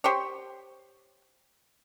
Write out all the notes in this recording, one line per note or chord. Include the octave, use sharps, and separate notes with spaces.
G4 C5 C#5